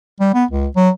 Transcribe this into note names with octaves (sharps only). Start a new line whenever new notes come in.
G3
B3
C#2
F#3